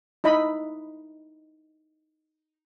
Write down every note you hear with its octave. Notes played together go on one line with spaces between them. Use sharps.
D#4 E4 D#5 B5